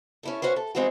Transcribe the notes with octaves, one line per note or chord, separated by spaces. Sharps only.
C#4 E4 A4
C#4 F#4 B4 C5
A4
E3 G#3 C4 D#4 E4 F#4